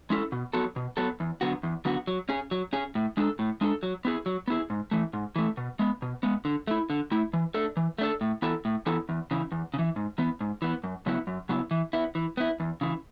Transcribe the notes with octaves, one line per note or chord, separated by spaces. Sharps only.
G#3 C#4 E4 A4
B2
F#3 B3 F#4 A4
B2
F#3 B3 F#4 A4
E2
D3 F#3 B3 F#4
E2
D3 F#3 B3 F#4
F#3
C#4 G#4
F#3
C#4 G#4
A2
G#3 D4 A4
A2
G#3 D4 A4
F#3
B3 E4 G#4
F#3
B3 E4 G#4
G#2
E3 A3
G#2
E3 A3
B2
G#3 B3
B2
G#3 B3
D3
A3 E4
D3
A3 E4
E3
A3 D4 A4
E3
A3 D4 A4
A2
E3 B3 E4 A4
A2
E3 B3 E4 A4
E2
C#3 E3
E2
C#3
E3
G#2
E3 B3
G#2
E3 B3
F#2
C#3 F#3 B3 E4
F#2
C#3 F#3 B3 E4
E3
B3 E4
E3
B3 E4
E2
C#3 E3